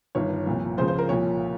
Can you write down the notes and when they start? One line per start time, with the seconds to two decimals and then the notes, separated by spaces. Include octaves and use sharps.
0.15 G1 G2 D#3 C#5
0.46 C2 A#2 F3
0.78 C#2 C#3 F3 C5
0.88 C5
0.99 A#4
1.09 C2 A#2 F3 C#5